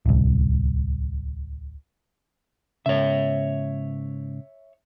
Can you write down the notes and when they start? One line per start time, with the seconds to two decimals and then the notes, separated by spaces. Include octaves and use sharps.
0.06 D1 C2
2.86 G#2 C#3 C#5 E5